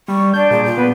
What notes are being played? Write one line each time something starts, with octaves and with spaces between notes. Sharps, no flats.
G3 C#6
D4 D5 G6
A#2 G#4
F4
B3 B4